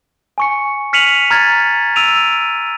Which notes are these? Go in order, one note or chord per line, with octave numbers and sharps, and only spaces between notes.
G#5 C#6 C#7
F6 B6 C#7 D#7 F7 F#7
A#5 F6 G#6 A6
E6 D7 D#7 F7